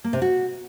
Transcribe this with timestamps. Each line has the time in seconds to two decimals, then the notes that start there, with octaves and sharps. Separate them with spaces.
0.04 A#3
0.13 C3
0.22 F#4